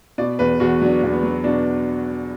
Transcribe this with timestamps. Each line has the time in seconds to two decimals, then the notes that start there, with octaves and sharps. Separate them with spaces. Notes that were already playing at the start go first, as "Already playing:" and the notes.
0.18 B2 D5
0.39 E2 B4
0.60 E2 F#4
0.82 F#3 D4
1.03 E2
1.13 B3
1.23 F#3
1.44 B2 D4